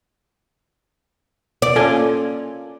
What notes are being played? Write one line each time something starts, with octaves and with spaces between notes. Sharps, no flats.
D5
A#3 C#4 F4 A4 G#5